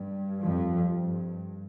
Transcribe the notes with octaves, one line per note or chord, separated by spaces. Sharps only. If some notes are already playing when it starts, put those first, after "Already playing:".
Already playing: G2
F2 F3
G2